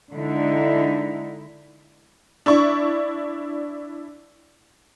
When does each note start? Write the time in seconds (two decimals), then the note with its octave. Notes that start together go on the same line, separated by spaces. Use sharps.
0.12 D3 G#3 D#4 E4
2.46 D4 E4 D5 C#6